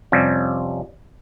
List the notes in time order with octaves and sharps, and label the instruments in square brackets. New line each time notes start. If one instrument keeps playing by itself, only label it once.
[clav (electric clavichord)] F2 C3 G3 C#4